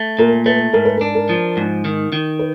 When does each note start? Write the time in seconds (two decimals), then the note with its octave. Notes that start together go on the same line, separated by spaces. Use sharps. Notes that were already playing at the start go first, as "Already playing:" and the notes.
Already playing: A3
0.19 A#2 A#4
0.46 A3 B4
0.73 G#2 A#4
0.85 B4
0.97 A#4
1.01 D4
1.15 A#4
1.29 F3
1.57 G#2
1.85 D#3
2.12 D#3
2.39 B4